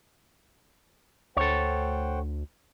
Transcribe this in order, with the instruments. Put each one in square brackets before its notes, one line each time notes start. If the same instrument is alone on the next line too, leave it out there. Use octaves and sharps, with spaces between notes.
[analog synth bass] D2 [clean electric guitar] A4 C#5 [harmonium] C5 F#5 G5